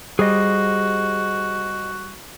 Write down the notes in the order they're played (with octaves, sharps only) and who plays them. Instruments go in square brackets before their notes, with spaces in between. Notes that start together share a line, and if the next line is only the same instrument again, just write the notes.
[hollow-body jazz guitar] G3 [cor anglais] F#4 [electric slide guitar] G#4 C5 D#5